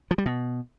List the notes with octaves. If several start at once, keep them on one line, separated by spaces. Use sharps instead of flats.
F3
G3
B2